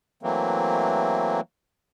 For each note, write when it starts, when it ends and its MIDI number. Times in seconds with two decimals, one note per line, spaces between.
0.23 1.40 52
0.23 1.40 54
0.23 1.40 57
0.23 1.40 58
0.23 1.40 60